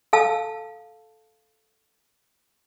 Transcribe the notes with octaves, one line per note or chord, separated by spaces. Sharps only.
A4 F5 A5 E6